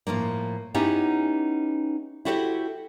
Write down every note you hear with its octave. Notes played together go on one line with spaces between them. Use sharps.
A2 F3 A3 A#3
B3 C#4 D#4 E4 G4
E4 F#4 G4 A4 B4 C5